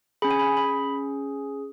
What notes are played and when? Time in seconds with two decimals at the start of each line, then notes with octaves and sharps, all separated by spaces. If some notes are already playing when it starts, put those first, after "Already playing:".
0.22 C#4 G#4 B5
0.31 G#5
0.39 B5
0.57 B5